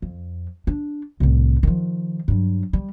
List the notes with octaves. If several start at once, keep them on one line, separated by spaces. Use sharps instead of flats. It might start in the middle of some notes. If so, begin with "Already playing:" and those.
F2
D4
C2 A2
D#3 F3
G2 F#3
G3